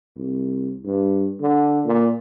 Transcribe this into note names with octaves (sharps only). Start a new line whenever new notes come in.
C2
G2
D3
A#2